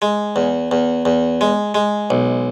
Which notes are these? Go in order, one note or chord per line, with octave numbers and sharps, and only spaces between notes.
G#3
E2
E2
E2
G#3
G#3
B1